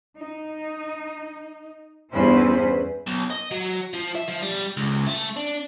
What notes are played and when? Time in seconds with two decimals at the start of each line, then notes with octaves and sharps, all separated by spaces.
0.18 D#4
2.12 E2 G2 C#4 E4 B4 C5
3.07 B1
3.30 D#5
3.51 F#3
3.94 F3
4.15 E5
4.28 F3
4.42 G3
4.77 C#2
5.07 A3
5.36 D4